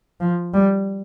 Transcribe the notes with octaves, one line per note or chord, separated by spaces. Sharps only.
F3
G3